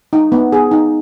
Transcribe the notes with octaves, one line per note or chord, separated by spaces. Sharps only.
D#4
B3
G#4
D#4